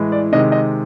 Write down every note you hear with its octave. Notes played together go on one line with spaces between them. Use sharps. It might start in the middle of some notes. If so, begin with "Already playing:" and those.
Already playing: A2 E3 G#3
D5
C3 D#3 G#3 D#5
D#5